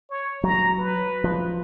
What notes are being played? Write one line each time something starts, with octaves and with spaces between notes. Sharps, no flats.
C#5
F#3 A#5
B4
F3